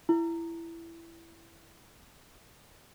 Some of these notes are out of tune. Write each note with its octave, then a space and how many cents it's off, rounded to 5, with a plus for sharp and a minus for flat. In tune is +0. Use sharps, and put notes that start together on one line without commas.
E4 +15